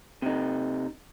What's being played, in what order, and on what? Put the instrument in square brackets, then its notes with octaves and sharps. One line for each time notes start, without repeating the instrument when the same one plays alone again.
[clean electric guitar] C3 D#4